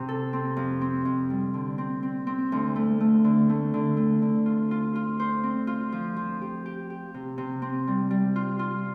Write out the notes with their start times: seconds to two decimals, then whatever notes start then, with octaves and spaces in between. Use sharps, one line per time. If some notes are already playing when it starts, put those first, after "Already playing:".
Already playing: C3
0.09 A4
0.33 C4
0.57 F2
0.81 C4
1.05 F2
1.30 G3
1.54 D3
1.78 C4
2.03 C4
2.27 C4
2.52 D2
2.76 A3
3.00 A3
3.24 D3
3.49 A3
3.74 D3
3.97 A3
4.22 D3
4.46 F4
4.71 F4
4.95 F4
5.20 C5
5.44 C4
5.67 F4
5.92 F3
6.16 F3
6.41 G4
6.66 G4
6.90 G4
7.14 C3
7.38 C3
7.62 C4
7.87 G3
8.11 G3
8.36 F4
8.59 F4